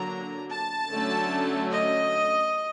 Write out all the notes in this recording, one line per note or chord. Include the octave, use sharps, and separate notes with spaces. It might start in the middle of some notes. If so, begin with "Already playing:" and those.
Already playing: D3 F#3 A#3 D4 A#5
A5
D3 F#3 A3 C#4
D#5